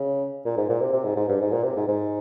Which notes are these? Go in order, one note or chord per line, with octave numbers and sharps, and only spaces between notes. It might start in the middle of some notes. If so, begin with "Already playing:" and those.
Already playing: C#3
A#2
G#2
A#2
C3
C3
G#2
G#2
G2
G#2
A#2
C3
G#2
G#2